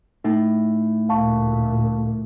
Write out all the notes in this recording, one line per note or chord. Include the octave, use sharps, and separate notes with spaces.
A2 D#4
D2 A#2 F5 A5 C#6